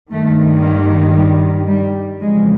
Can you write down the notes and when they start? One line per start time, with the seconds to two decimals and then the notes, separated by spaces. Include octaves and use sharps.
0.11 G2 D#3 A3
0.63 A#3
1.16 G3
1.68 G3
2.21 F2 C#3 E3 G#3